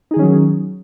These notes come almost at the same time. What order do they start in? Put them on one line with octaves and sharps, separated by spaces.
D#4 G#4 D#3 C#4 F#3